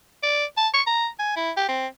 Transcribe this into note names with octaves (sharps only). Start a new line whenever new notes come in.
D5
A5
C#6
A#5
G#5
E4
G4
C4